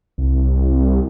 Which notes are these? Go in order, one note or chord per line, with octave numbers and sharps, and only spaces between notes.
C2